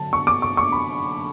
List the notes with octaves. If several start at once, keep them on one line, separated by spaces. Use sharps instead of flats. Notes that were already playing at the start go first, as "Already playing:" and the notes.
Already playing: D3 F#3 A5
C#6
D6
C#6
C#6
B5